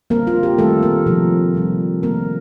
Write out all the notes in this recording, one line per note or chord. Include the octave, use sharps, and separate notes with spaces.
D3 G3 A#3 C4 A#4
F4
G4
D#3 G3 A3 C4 A4
A#3 A#4
C3 F3 A3 D#4
C3 G3 C4
D#3 A3 A#3 C4 A#4